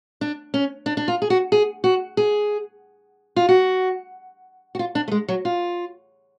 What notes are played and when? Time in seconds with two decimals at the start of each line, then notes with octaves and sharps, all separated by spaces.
0.21 D4
0.54 C#4
0.86 D4
0.97 D4
1.08 F4
1.22 G#4
1.30 F#4
1.52 G#4
1.84 F#4
2.17 G#4
3.36 F4
3.49 F#4
4.75 F#4
4.79 F4
4.95 D4
5.08 A3
5.12 G#3
5.28 F#3
5.45 F4